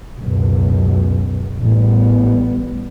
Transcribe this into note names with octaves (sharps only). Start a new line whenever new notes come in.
C#2 F#2 B2
A1 G3 B3